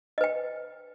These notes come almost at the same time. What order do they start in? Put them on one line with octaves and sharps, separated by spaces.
D#5 B4 G5